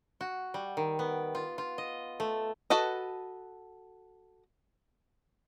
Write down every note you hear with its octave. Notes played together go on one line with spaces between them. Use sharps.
F#4
G3
D#3
B3
F4
F4
D#5
A3
F#4 A4 B4 D#5